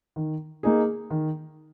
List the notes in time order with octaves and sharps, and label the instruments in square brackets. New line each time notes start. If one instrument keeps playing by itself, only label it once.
[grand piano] D#3
A#3 D#4 G#4
D#3